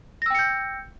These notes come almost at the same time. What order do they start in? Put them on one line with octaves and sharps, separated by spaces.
A#6 E6 G5 C#7 G6